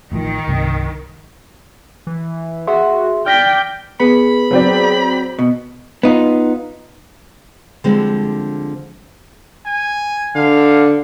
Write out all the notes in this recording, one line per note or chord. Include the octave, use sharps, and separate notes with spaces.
A1 A2 D#3 F3
C2 G2 C3
E3
F#4 G#4 E5 C6
D5 G5 F6 A#6 B6
B3 G#4 B5
F#3 C4 D5
B2
B3 D#4 F4
D3 F3 G3 G#3 C4
G#5
D3 F5